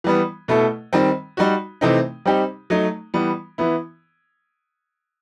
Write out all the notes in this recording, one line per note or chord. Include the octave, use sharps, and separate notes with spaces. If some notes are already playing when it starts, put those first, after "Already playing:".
E3 G3 B3
B2 A3 E4 A4
D#3 G3 C4
G3 D#4 F#4
C3 E3 A3 C4 D#4
G3 C4 D#4 G4
F#3 A3 D#4
E3 G3 B3
E3 B3 E4